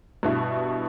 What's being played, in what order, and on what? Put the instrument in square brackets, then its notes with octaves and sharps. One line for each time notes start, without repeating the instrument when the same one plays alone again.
[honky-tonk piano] G2 B2 E4